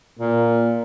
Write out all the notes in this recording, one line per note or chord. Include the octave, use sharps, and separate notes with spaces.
A#2 A#3